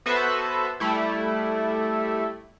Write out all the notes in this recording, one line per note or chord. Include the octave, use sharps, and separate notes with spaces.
B3 F#4 A4 B4 C5 E5
G3 A3 E4